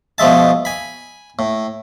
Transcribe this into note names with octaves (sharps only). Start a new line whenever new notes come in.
B2 F3 G#3 E5 A5
G#5 B5
A2